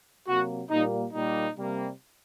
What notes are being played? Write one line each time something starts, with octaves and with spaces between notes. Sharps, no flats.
C3 F#3 A#3 F#4
A#2 G3 A#3 D#4
A#2 G3 A#3 D#4
C3 G3 A#3